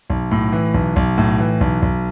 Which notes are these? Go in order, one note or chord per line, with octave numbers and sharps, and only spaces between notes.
B1
A2
E3
B1
B1
A2
E3
B1
B1